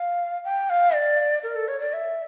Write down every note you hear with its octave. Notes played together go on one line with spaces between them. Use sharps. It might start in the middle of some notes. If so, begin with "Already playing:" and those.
Already playing: F5
G5
F5
D5
A#4
A4
C#5
D5
E5